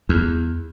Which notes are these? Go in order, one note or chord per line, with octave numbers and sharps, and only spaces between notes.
E2